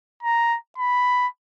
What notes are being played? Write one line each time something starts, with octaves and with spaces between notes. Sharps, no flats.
A#5
B5